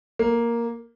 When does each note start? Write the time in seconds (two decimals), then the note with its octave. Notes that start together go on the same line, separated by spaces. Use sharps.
0.19 A#3